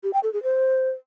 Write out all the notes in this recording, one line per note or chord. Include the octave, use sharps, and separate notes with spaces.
G4
G5
A4
G#4
C5